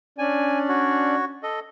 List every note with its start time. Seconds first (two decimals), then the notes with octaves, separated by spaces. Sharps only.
0.18 C#4 D4 D5 G#5
0.69 F#4 C#5
1.43 A4 D#5